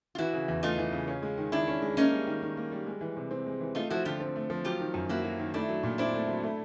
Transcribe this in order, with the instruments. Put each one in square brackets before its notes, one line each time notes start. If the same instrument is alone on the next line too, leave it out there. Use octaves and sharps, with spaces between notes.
[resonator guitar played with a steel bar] F4
[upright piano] E3 [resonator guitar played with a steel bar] E4 F#4
[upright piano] C#3
E2
[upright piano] A3 [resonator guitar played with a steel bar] D#4 F4
[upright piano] E3
C#3
C#4
G#3
D#3
[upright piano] D#3 [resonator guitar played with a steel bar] D4 E4
[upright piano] C#4
G#3
[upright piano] A#3 [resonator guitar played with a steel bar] C#4 D#4
[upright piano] G3
D#3
D#3
A#3
G3
G#3
E3
C3
C4
G#3
E3
[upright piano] A3 [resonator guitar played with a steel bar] D#4 F4
[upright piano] F3 [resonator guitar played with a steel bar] E4 F#4
[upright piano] D3 [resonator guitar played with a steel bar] F4 G4
[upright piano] C4
A3
F3
[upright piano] F#3 [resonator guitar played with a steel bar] F4 G4
[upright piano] D#3
F#2
[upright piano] A#3 [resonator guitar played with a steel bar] E4 F#4
[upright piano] F#3
D#3
[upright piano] A3 [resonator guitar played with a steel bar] D4 E4
[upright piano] F#3
A#2
[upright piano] C4 [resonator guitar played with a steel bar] D4 E4
[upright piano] A3
F#3
A3